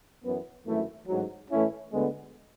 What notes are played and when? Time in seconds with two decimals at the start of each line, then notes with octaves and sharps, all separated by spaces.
0.24 F#2 E3 B3
0.66 G#1 F#2 E3 A3 E4
1.07 A1 G#2 F#3
1.51 A2 E3 A3 C#4 E4
1.93 D2 D3 G#3 B3